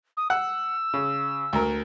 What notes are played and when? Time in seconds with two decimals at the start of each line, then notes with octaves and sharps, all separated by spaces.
0.17 D#6
0.30 F#5 E6
0.94 C#3
1.53 D2 A#4